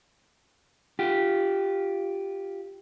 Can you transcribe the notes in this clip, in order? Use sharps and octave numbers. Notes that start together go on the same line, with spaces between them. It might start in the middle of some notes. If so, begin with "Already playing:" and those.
F4 G4